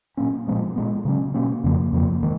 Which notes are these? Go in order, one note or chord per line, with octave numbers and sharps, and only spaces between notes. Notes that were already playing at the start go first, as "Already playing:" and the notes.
A#2 F#3 A#3 C#4
A#2 F3 G#3 B3
A#2 G#3 B3
C#3 F#3 C#4
B2 F#3 A#3 C#4
F2 C#3 F3 A#3
F2 C#3 F3 A#3
D#3 G#3